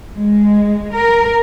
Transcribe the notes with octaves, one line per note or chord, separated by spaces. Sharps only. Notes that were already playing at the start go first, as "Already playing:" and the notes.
G#3
A#4